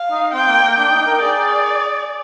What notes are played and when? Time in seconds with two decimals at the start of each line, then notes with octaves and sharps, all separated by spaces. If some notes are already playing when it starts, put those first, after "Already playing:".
Already playing: F5
0.11 D#4
0.33 C4 G5
0.48 A#3
0.62 A#3
0.77 D4 G5
0.91 D#4
1.07 A#4
1.21 G#4 D5